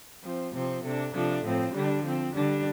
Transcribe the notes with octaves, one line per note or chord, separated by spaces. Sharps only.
F3 C4
C3 F3 C4
C3 A3 D4
C3 F3 A3 D4
A2 F3 C4
D3 G3 D4
F3 C4
D3 G3 D4